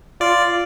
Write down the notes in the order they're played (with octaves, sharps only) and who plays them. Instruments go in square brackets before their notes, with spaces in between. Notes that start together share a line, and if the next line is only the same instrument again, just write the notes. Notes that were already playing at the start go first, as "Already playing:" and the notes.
[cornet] F4 [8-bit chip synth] D5